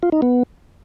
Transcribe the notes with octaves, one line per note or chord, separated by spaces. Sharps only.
F4
D#4
B3